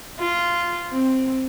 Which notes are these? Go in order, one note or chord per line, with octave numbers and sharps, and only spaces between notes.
F4
C4